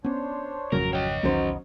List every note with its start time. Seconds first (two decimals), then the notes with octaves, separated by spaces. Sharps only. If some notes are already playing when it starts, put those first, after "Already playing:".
0.04 B3 C#4 D4 C5 C#5
0.72 G#1 F2 C#3 F#3 A#4
0.93 C#5 D#5 F#5 G5 F6
1.23 B1 E2 D#3 F#3 B3 C#4 D#4 C5